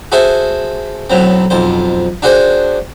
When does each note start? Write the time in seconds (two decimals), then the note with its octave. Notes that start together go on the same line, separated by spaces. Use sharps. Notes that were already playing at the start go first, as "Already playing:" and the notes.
0.12 F#4 G#4 A4 C5 E5
1.10 B1 A2 F#3 C4
1.50 B1 F2 C5
2.22 D4 F#4 G#4 C5 G5